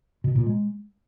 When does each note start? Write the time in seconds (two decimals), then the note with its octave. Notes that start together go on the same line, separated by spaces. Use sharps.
0.24 B2
0.35 A#2
0.46 G#3